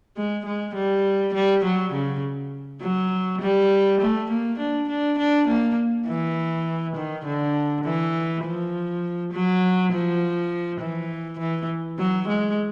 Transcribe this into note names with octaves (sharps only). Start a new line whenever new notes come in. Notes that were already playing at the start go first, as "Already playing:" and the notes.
G#3
G#3
G3
G3
F#3
C#3
F#3
G3
A3
A#3
D4
D4
D4
A#3
E3
D#3
D3
E3
F3
F#3
F3
E3
E3
F#3
G#3